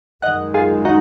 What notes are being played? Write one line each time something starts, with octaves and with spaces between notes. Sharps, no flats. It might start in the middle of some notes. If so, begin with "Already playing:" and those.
F#2 D#3 G#3 D#5 F#5
F4 G#4
D#4 F#4